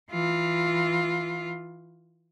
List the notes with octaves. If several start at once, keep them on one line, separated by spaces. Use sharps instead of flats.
E3 F4